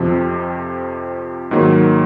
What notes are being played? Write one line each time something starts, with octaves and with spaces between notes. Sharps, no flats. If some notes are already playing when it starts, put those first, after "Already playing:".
Already playing: F2 C3 F3
G#2 D#3 F#3 A#3